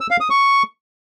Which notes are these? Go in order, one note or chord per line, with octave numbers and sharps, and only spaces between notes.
E6
F5
D#6
C#6